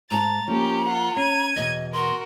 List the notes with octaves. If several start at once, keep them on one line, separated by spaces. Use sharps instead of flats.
G#2 A5 A#5 A6
F3 A#3 C#4 G4 A#4
F4 F#5
C#4 G#6 D#7
E2 B2 D#5
F#4 A#4 C6